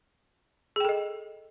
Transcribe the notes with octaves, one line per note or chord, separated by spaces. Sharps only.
G#4 A4 D#5 G5